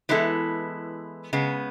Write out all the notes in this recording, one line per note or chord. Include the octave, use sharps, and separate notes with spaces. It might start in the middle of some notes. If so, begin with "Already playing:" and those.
E3 G#3 B3 E4 A4
C#3 G#3 B3